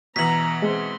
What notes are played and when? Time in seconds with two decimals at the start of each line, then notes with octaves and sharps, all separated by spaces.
0.16 B2 E3 A#5 B6 F#7
0.62 G#3 C4 C6